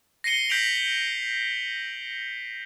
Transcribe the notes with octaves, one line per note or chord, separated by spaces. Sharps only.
A#6 C7 C#7 D#7 G7
G6 B6 D7 F7 F#7